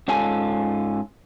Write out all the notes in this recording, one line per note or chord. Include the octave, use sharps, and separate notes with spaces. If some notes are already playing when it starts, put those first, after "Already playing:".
G#2 C#4 F4 A4 G#5